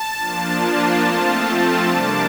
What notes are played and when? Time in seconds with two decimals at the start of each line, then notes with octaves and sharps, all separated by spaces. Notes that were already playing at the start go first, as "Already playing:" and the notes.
Already playing: A5
0.17 F3 A#3 D4 F4
1.01 F3 A3 C4 F4
1.86 C3 G3 A#3 D4 D6